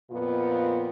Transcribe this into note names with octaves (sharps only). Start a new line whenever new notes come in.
F2 A#2 B3 F4